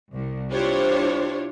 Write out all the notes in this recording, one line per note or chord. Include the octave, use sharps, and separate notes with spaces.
C2
D4 E4 F4 G4 C5 C#5